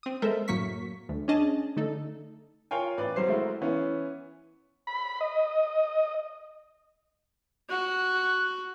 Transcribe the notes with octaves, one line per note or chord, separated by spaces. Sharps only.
C4 D#6
G#3 B3 A4 A#4 C5 E5
F#2 A2 F#3 A#3 C#6 B6
D2
C#4 D4 G#4 D#5 A5
D3 A3 D#4 A4
F4 A#4 C#5 F5 G5 G#5
A1 B4 D5
F#3 G3 C4 C5 C7
G#3 A3 C4 E4 F#4 A#4
E3 B3 C#4
B5
D#5
F#4 F#6